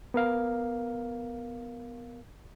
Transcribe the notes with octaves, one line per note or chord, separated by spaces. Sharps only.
B3 A#4 F5